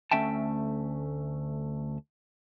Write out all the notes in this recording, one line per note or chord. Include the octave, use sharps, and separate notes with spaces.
D2 A3 C#4 E5 G5 A5